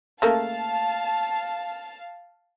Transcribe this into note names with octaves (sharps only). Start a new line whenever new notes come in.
C#3 A3 A#3 F5 A5